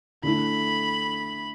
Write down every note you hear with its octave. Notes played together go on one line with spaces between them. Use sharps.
D3 A3 E4 B5